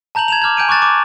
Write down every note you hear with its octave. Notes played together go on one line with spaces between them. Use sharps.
A5 A#5 G6 F7 F#7
G#6 E7 F7
D6 F6 G6 G#6
G#5 G6 D7 D#7
C#6 D6 F#6 A6 E7
D6